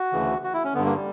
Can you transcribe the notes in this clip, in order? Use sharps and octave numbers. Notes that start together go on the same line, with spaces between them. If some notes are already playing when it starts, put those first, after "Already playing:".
Already playing: F#4
D2 C#3 E3
F#4
E4
C#4
G2 D3 B3
A#3
G3